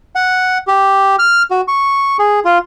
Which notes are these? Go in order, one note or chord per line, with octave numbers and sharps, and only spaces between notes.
F#5
G4
F6
F#4
C#6
G#4
F4